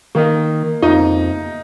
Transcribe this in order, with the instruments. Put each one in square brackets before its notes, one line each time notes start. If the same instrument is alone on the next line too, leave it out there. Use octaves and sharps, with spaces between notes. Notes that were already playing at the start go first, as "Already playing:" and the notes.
[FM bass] D#3 [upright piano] A#3
[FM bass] F2 [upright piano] D#4